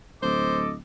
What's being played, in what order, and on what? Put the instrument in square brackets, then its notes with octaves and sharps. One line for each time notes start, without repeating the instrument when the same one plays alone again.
[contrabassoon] D1 [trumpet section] A4 D#5 D6 [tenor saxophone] C5